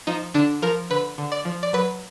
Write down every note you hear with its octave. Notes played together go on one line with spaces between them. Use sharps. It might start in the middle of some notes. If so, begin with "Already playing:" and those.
F3 D#4
D3 D4
F3 A#4
D3 B4
D3
D5
F3
D5
F#3 B4